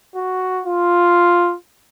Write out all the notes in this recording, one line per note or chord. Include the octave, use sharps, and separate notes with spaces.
F#4
F4